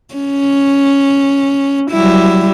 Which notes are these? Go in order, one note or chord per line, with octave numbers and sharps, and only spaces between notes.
C#4
F#3 G3 E4